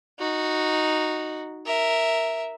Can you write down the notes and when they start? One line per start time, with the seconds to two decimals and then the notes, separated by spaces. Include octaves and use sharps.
0.19 D#4 F#4
1.66 A#4 E5